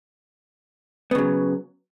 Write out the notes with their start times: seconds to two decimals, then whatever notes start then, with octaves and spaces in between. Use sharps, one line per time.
1.11 B3
1.15 C#3
1.18 F#3